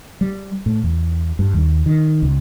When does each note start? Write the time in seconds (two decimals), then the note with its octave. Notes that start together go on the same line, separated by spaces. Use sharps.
0.21 G3
0.66 A2
0.84 E2
1.39 G2
1.54 D#2
1.86 D#3
2.22 C#2